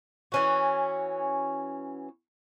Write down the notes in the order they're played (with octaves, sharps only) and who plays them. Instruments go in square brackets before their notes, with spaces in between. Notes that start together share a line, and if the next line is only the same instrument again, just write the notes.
[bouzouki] E3 C#4 F#4